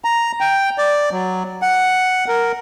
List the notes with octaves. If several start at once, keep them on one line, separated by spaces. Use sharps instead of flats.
A#5
G5
D5
F#3
F#5
A#4